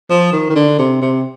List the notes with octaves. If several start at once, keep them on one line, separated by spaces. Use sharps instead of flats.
F3
D#3
D#3
D3
C3
C3